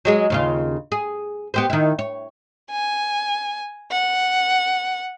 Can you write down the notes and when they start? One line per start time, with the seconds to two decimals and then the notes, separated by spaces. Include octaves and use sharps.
0.05 F#3 G#3 G#4
0.30 D#2 C#3 F4
0.92 G#4
1.54 B3 G4 C5
1.70 D#3 E4
1.99 C#5
2.70 G#5
3.91 F#5